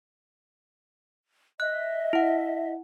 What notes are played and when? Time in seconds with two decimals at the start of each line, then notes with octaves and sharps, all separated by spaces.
1.60 D#5 E5 F#6
2.13 E4 F#5